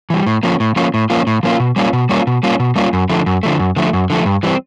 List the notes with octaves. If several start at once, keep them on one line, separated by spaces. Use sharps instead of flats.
E3 G3
A2
F3 A#3 C#4 F4
A2
F3 A#3 C#4 F4
A2
F3 A#3 C#4 F4
A2
F3 A#3 C#4 F4
B2
G3 A#3 C#4 F4
B2
G3 A#3 C#4 F4
B2
G3 A#3 C#4 F4
B2
G3 A#3 C#4 F4
F#2
D3 F3 A3
F#2
D3 F3 A3
F#2
D3 F3 A3
F#2
D3 F3 A3
G2
E3 G3 C4